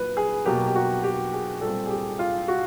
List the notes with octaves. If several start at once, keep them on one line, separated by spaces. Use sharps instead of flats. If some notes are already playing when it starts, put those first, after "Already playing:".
Already playing: A#2 F#3 A#3 B4
G#4
B2 F#3 A#3 G4
G4
F#4
G4
G#4
A#2 G3 C4 A4
G#4
G4
F4
F#4